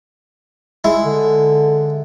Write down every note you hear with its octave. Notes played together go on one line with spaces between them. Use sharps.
G#3 E4
D3